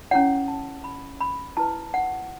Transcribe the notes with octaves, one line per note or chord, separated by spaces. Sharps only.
C#4 E4 C#5 F#5
A5
B5
B5
E4 B4 A5
F#5